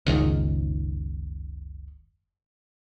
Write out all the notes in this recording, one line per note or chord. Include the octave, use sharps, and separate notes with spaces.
F#1 C#2 G#2 D#3